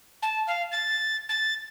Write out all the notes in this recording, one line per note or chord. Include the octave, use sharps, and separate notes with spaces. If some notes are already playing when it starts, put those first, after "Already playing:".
A5
F5
A6
A6